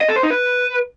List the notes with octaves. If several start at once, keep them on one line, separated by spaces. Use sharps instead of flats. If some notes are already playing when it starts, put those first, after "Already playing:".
D#5
A4
C5
D#4
B4